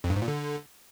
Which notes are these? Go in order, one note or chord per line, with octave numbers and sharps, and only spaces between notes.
F2
G2
G#2
A#2
D3